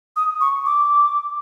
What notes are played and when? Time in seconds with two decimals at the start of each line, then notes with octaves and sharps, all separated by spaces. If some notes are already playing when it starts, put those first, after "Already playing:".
0.16 D#6
0.41 C#6
0.66 D6